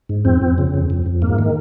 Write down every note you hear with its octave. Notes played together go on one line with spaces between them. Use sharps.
G#2
F2 C4
F2
C#3
F2
F2
F2
G#2 A#3
D#3